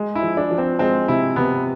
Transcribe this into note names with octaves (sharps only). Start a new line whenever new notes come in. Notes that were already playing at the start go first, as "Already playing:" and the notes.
Already playing: G#3
E4
F3
D4
F3
C4
G#3 C4
C3 E4
C3 B3